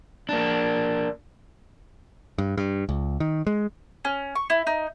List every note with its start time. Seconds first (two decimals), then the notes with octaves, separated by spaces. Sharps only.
0.29 A#3 D4
2.38 G2
2.58 G2
2.89 C#2
3.20 D#3
3.47 G#3
4.05 C#4
4.35 C#6
4.50 E4
4.67 D#4